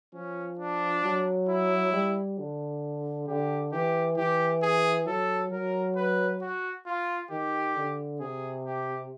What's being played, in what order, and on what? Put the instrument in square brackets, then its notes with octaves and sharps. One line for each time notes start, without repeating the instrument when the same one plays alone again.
[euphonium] F3 [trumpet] C#4
[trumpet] D4
[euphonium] F#3
[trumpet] E4
[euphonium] G3
D3
[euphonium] D3 [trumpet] G4
[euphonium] E3 [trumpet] G4
[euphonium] E3 [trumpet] G4
[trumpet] G#4
[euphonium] F#3 [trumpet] A4
[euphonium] F#3 [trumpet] A#4
[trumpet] B4
F#4
F4
[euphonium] D#3 [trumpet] G4
[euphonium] D3
[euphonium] C3 [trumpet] G#4
[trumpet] G4